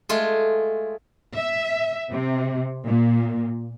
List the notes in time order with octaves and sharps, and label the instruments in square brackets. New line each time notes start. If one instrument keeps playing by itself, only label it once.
[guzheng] G#3 A3 F4 G#4
[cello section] E5
C3
A#2